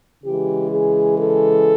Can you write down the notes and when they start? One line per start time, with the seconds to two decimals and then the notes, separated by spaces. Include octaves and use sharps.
0.24 C#3 E3 G#3 G4
0.70 G#4
1.16 A4